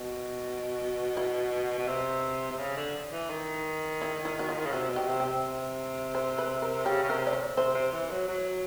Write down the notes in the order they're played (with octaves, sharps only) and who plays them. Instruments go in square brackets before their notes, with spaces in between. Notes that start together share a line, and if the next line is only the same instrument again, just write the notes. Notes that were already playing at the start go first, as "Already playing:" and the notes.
Already playing: [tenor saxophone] B2
[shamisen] E4
[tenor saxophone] B2
C3
C3
C#3
D3
E3
D#3
[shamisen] E4
E4
F#4
F4
[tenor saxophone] C#3
[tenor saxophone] C3 [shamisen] F#4
[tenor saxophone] B2
[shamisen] G4
[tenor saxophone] C3
[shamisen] G4
[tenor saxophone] C3
[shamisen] C5
B4
A#4
[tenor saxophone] C#3 [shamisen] G4
[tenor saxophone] C#3
[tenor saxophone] C3 [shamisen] A#4
[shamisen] D5
C#5
[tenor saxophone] C3 [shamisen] C5
[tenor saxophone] C3
E3
F#3
F#3